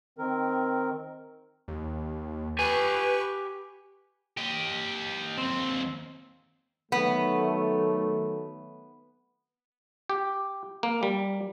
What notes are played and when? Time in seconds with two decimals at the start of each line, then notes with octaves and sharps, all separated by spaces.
0.18 D#3 C4 A#4
1.68 D#2
2.59 G4 B4 G#5 C#6
4.37 G4 D#5
5.38 D#2 C4
6.92 D#3 F#3 A3 B3
10.10 G4
10.83 A#3
11.03 G3